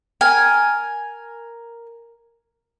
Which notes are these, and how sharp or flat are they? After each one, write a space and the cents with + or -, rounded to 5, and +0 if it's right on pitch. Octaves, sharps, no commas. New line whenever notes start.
A#4 +0 G#5 +0